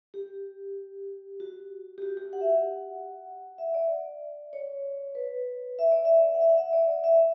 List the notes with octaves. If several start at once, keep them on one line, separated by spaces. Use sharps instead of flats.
G4
F#4
G4
F#4
G4
F#5
E5
F#5
E5
D5
C#5
B4
E5
D5
E5
F#5
E5
F#5
E5
D5
D5
E5